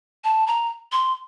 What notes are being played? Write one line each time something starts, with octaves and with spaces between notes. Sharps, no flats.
A5
A#5
C6